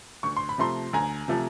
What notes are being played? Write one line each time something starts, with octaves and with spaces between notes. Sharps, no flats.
D2 C#6
C6
B5
C3 F3 A3 A#5 C6
D2 G#5 A#5
C3 F3 A3